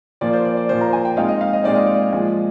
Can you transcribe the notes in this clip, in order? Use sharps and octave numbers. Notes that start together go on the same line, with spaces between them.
A#2 F3 A#3 D5
C5
D5
D5
A#2 F3 A#3 C5
A#5
G#5
G5
A#2 G#3 C4 D#4 F5
D#5
F5
D#5
A#2 G#3 C4 D#4 D5
D#5
D5
A#2 F3 G#3